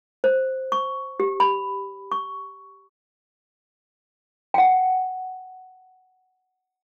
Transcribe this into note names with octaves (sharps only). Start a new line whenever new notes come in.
C5
C#6
G4
B5
C#6
F#5 G5